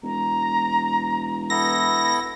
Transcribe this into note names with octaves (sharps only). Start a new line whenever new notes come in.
E1 A#5
B3 E4 A4 A#6